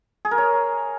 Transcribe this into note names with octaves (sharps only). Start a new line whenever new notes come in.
G#4
A#4
C#5